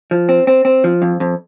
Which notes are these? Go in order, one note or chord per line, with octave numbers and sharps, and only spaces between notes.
F3
C4
C4
C4
F3
F2
F2